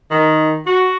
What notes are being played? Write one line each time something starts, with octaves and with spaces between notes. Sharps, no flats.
D#3
F#4